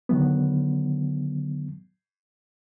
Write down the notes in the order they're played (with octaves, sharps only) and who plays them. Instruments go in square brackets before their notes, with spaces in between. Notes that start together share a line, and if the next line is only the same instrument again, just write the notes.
[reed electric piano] D3 D#3 F#3 B3